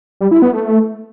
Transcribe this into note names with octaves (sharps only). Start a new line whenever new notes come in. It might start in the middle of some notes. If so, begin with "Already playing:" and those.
G3
E4
B3
A3